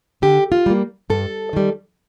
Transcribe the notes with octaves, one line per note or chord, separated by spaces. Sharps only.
D3 G4
F4
G3 A#3
G2 A4
D#3 G3